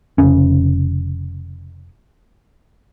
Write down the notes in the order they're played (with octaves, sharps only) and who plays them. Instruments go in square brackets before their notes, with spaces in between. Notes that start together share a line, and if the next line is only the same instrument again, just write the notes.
[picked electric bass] F1 C#3 C#4